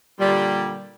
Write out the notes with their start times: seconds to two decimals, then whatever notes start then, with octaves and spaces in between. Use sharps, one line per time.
0.20 A#2 D3 G3